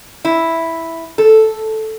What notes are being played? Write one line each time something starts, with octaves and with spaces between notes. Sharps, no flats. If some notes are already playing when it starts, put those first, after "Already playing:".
E4
A4